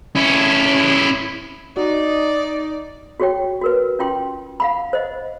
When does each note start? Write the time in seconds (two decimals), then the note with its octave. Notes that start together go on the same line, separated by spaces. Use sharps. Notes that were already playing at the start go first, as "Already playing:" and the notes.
0.15 C#4 E4
1.77 D#4 F#4 D5
3.20 F#4 G4 C#5 G5
3.62 F#4 A#4 B4
3.99 C#4 F4 G5 C6
4.60 F5 F#5 B5
4.93 C5 D#5 F#5